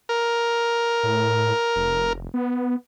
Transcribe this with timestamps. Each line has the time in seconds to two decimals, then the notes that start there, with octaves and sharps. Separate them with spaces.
0.09 A#4
1.03 A2
1.76 F1
2.34 B3